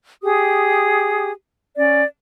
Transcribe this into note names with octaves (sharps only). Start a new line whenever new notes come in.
G4 G#4 D#6
C#4 D5